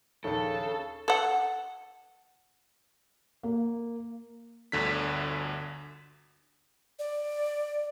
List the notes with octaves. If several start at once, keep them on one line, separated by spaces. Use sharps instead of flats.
A#1 D#2 C#3 A4
A4 F#5
A#3
G1 D2 D3 B6
D5